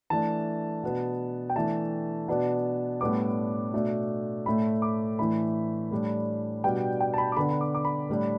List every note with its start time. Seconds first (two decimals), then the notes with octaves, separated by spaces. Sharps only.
0.10 E3 A3 D4 A5
0.83 B2 B3 D4
1.50 G5
1.55 E3 A3 D4 A5
2.28 B2 B3 D4
3.01 A2 G3 B3 D4 D6
3.73 B2 A3 D4
4.46 A2 A3 D4 B5
4.82 D6
5.18 A2 E3 A3 D4 B5
5.91 A2 G3 D4
6.64 B2 G3 B3 D4 G5
7.00 G5
7.14 A5
7.18 B5
7.32 D6
7.37 D3 B3 D4 B5
7.51 B5
7.61 D6
7.75 D6
7.85 B5
8.09 A2 G3 D4